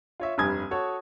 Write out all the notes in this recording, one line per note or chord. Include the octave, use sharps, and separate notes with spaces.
F4 C#5 E5
F1 G2 G3 G#5 D#6 G#6
F#4 A4 C#5